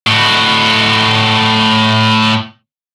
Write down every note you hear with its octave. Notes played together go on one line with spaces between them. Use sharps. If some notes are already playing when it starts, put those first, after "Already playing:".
A2 F#4